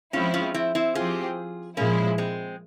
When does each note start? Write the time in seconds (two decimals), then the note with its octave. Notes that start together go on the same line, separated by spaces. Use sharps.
0.13 F3 G#3 C4 C#4 E4 F4
0.34 C#4 F4
0.54 C4 E4
0.75 C4 E4
0.95 F3 C4 F4 G4 G#4
1.77 A#2 F3 G#3 A#3 C#4 E4
2.18 G#3 C4